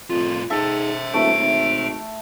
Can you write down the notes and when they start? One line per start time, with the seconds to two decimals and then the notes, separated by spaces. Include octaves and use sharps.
0.10 F2 A2 F4
0.50 G#2 A4 E5 G5
1.14 D#1 A3 D7
1.39 G#1